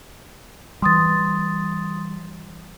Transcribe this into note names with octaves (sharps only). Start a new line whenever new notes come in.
E3 G3 C6 D#6 A6